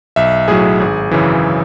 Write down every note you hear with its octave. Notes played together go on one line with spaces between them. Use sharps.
B1 E5
A2 F#3 G#4
G#1
F#2 C#3 E3